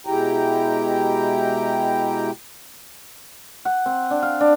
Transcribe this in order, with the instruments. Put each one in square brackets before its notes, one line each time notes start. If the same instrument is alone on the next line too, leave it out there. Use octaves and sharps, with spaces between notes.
[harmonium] B2 G#3 E4 G4 G5 A#5
[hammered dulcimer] F#5
C4
D4
F5
D4